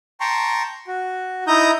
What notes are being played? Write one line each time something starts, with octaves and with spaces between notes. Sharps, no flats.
G5 A5 A#5 C6 C#6
F#4
D#4 E4 A#5 D#6 G6